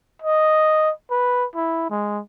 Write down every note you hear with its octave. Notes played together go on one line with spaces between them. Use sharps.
D#5
B4
E4
G#3